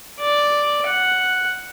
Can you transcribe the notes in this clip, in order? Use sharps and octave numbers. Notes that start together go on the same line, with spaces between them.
D5
F#5